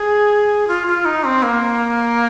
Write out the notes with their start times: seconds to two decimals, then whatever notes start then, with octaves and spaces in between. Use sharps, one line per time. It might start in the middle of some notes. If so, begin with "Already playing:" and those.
Already playing: G#4
0.68 F4
0.87 F4
1.05 D#4
1.24 C4
1.43 A#3